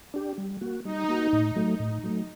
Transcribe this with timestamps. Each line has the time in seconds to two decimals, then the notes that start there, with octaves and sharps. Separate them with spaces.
0.14 D4 G4
0.38 G3
0.61 A#3 F#4
0.85 G3 D#4
1.08 A#3 F#4
1.33 A2
1.56 F#3 A3
1.80 A2
2.04 F#3 A3